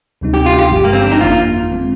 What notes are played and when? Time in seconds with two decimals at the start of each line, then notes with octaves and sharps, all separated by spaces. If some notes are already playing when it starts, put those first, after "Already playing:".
0.21 D2 C3 G3 C4 D#4
0.34 G4
0.46 F4
0.58 G4
0.71 G1 G2 D3 F3 G#3
0.84 A#3
0.93 C4
1.03 D4
1.11 D#4
1.21 G1 F2 D#3 A#3 F4
1.71 D3 G#3 C4